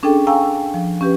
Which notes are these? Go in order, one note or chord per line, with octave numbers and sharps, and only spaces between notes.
C#4 D4 G#4 A4 G5
F5 G5 G#5 A#5 C#6 E6
F3
C#4 G4 B4